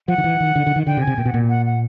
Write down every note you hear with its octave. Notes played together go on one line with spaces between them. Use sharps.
F3 F#5
D#3
E3
D#3
D3
D3
D#3
D3 G5
C3
G#5
C3
A#2 G5
B2
F#5
A#2
F#5
F#5